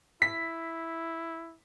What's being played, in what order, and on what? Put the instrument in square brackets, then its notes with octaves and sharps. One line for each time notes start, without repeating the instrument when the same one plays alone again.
[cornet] E4 [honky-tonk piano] B6